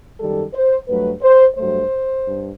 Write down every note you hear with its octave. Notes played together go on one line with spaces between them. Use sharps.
F#2 D#3 G3 A4
C5
G2 F#3 A3 B4
C5
G2 F#3 A3 C5
G2